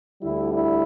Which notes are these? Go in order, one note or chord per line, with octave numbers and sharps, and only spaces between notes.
D2 D3 G3 E4
E4